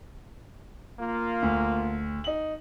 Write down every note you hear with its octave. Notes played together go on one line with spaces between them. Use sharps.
A#3 F4
D2
D#4 F#7